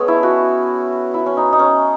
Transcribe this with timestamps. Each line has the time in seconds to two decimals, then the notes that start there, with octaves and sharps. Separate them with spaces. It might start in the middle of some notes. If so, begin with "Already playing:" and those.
Already playing: G#3 A3 B3 C#4
0.08 E4
0.23 F#4
1.14 E4
1.26 C#4
1.37 D#4
1.53 D#4
1.59 C#4